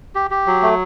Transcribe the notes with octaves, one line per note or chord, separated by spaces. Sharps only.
G4
G4
F#3
A3